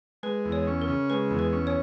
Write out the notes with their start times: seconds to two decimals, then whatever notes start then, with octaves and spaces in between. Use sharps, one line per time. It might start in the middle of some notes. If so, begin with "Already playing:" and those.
0.23 G#3 B4
0.45 E2
0.52 C#5
0.67 C#4
0.82 A#4
0.88 C#3
1.10 G#3 B4
1.31 E2
1.39 B4
1.53 C#4
1.67 C#5